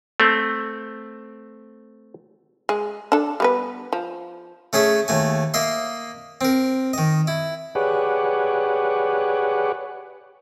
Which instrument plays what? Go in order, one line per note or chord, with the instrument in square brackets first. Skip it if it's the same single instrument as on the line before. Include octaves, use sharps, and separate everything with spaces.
[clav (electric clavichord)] A3 C4
[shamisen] G#3
D4 A4
G3 B3 B4
F3
[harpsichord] A3 C#4 G#4 E5
D#2 A3 G#5
A#3 D#5 E5 C6
C4 A#4
D#3 D#5
E4
[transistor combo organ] G4 G#4 B4 C#5 D5 F#5